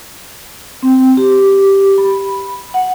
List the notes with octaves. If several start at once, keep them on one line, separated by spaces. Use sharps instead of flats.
C4
G4
B5
F#5